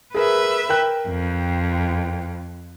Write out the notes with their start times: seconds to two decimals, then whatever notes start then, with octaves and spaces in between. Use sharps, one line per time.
0.14 G#4 A#4 B4 E5
0.69 A#4 G5 F#6
1.08 F2